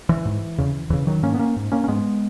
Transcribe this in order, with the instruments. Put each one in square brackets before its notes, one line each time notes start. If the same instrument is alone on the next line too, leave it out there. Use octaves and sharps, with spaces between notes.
[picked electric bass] E3
G#2
E2 C#3
E2 C#3 E3
D#3 F#3
G#2 A#3 C#4
B3
A#3 C#4
G#2
A#3 C#4
C#4
G#2 G#3 B3